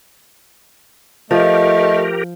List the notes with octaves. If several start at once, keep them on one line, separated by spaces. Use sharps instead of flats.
F3 A3 G4 A#4 D#5